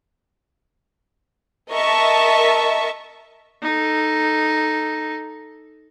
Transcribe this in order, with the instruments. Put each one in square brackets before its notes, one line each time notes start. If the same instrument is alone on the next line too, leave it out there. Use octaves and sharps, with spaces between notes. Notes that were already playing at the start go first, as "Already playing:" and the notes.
[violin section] A#4 D#5 E5 A5 C#6
[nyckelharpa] D#4 A4